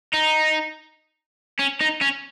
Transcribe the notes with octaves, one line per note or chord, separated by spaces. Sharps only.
D#4
C#4
D#4
C#4